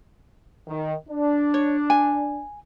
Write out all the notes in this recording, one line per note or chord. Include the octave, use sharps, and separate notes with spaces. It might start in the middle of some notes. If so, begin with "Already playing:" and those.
D#3
D4
C#5
G#5